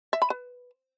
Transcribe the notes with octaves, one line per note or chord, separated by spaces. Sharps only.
E5
B5
B4